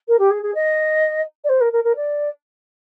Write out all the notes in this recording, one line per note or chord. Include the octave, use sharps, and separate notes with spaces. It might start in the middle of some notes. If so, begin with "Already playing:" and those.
A#4
G4
G#4
G#4
D#5
D5
C5
A#4
A#4
A#4
D5